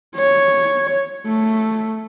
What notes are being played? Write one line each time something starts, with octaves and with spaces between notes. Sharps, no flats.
C#5
A3